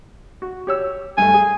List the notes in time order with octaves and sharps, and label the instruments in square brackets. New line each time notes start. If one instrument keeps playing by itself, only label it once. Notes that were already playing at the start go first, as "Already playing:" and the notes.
[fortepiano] F#4
G4 C#5 E6
[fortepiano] G2 A3 [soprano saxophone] G#5
[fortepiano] G#4